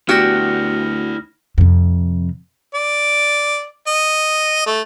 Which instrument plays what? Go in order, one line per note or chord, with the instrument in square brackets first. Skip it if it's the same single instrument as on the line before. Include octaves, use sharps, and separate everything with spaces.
[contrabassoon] D2 [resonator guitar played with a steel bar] B3 F#4 G4 [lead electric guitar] E4 D5 [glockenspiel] F6 A#6
[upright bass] F2 C3
[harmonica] D5
D#5
A3